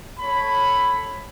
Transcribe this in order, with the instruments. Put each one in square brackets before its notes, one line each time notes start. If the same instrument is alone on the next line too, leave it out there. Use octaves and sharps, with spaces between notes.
[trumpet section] A4 C#5 B5